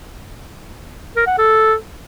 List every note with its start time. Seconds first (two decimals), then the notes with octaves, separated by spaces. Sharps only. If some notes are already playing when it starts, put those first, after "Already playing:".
1.16 A#4
1.27 F#5
1.38 A4